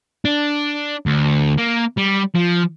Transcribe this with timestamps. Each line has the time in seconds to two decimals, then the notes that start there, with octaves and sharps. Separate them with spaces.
0.25 D4
1.06 D2
1.58 A#3
1.97 G3
2.35 F3